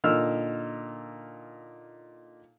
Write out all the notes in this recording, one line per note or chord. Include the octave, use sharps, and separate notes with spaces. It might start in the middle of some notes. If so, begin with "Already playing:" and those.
A#2 D3 D#4 E6 F6